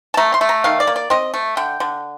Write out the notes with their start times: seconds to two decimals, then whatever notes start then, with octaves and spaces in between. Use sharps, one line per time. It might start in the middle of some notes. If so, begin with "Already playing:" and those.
0.14 A5
0.17 A3 A#5
0.34 C6
0.41 A3
0.49 A#5
0.64 D#3 F5
0.80 D5
0.87 A#3
0.96 D5
1.10 C4 D#5
1.34 A3
1.57 D3 G5
1.80 D3